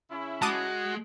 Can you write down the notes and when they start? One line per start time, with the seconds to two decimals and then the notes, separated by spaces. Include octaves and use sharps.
0.11 C#3 C#4 E4
0.42 G#3 F#4 A5 D6 D#6